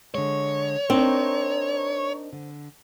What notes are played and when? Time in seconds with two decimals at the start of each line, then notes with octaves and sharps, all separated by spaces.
0.15 D3 G#3 C#5
0.90 C4 D4 D#4 A#4
2.33 D3